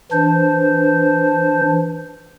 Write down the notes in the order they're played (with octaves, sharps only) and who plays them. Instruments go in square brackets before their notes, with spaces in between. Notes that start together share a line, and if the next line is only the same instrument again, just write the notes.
[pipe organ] E3 D4 C5